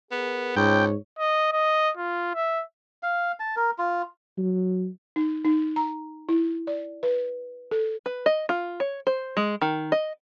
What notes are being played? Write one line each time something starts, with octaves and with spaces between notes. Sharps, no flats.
B3 G#4 A#4
C#2 G#2 C#5 G5
D#5
D#5
F4
E5
F5
A5
A#4
F4
F#3
D#4
D#4
A#5
E4
D5
B4
A4
B4
D#5
F4
C#5
C5
G#3
D#3
D#5